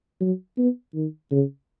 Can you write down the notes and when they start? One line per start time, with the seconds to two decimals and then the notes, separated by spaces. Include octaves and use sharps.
0.21 F#3
0.57 B3
0.95 D#3
1.31 C#3